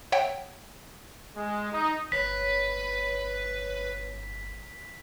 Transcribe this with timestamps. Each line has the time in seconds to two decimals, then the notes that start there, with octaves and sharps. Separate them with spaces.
0.12 C#5 E5 F#5 G5
1.36 G#3
1.72 D#4
2.12 G1 B4 C#5 B6